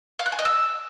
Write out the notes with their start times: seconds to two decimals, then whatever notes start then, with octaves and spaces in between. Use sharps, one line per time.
0.19 F5
0.26 F#6
0.32 G#5
0.39 D#5
0.45 E6